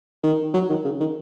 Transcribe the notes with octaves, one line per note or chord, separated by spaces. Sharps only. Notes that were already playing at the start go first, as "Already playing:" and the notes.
D#3
F#3
D#3
C#3
D#3